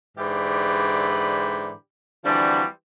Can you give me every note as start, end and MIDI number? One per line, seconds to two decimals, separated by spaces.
0.18 1.73 44
0.18 1.73 50
0.18 1.73 52
0.18 1.73 67
0.18 1.73 74
0.18 1.73 83
2.25 2.65 50
2.25 2.65 52
2.25 2.65 53
2.25 2.65 55
2.25 2.65 60
2.25 2.65 66